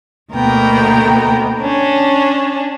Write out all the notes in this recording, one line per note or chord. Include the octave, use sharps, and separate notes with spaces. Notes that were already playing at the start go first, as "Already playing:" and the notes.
D2 B2 A#3 B3 A#4 G5
C#4 D4